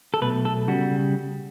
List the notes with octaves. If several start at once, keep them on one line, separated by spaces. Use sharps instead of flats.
A4
B1 B2 A3 B4
A4
C#3 G3 F#4